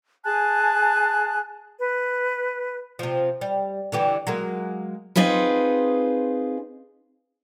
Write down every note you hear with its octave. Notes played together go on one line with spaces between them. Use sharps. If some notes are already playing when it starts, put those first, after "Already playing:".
G#4 G#5 A5 F#6
B4
C3 F3
G3
D3 E3 G4
F#3 G#3 A#3
C4 D#4 F4 G#4 B4